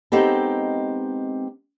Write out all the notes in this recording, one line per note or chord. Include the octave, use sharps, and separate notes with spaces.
G#3 B3 C4 D#4 G4 A4